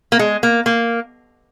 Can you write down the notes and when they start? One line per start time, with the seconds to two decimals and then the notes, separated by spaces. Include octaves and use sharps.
0.12 A#3
0.19 G#3
0.43 A#3
0.66 A#3